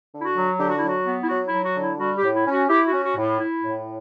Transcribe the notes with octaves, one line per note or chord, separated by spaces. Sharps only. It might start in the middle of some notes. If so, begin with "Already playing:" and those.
D3
E4
F#4
F#3
D3 G4
F#4
F#3 E4
F#4
B3
E4
F#3 F#4
E4
F#3
F#4
D3
E4
G3 F#4
G4
A2
E4
C#4
F#4
E4 G4
C#4 F#4
F#4
A2
E4
A2